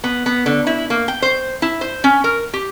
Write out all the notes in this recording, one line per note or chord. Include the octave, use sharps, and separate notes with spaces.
B3
B3
D3
E4
A#3
G5
C5
E4
C5
C#4
A#4
G4